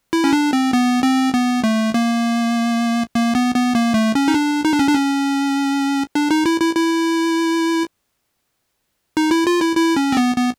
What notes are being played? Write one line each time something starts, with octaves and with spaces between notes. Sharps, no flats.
E4
C#4
D4
C4
B3
C4
B3
A3
A#3
A#3
B3
B3
A#3
A3
C#4
D#4
D4
D#4
D4
C#4
D4
C#4
D4
D#4
E4
E4
E4
D#4
E4
F4
E4
E4
C#4
C4
B3
B3